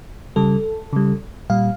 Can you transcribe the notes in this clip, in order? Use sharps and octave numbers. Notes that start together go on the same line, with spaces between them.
C#3 G3 A4
C#3 G3
A#2 G3 F5